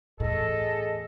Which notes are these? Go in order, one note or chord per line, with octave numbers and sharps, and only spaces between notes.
E2 A2 G#4 A4 D#5